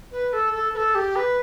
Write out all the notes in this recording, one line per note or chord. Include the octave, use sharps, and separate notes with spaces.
B4
A4
A4
B4
A4
G4
B4